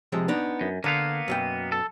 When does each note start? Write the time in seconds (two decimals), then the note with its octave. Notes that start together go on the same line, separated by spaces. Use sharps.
0.12 C3 F3 G#3
0.28 B3 D4 D#4
0.61 F#2
0.84 D3 A#3 B3 F5
1.28 F#2 B2 G5
1.72 A4